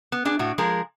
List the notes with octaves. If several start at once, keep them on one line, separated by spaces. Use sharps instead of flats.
B3
B3 D4 G#4
A2 F#4
F3 G#3 G#4 A#4